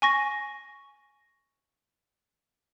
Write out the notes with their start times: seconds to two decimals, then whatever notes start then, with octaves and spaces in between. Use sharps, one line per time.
0.02 G#5 C#6 A#6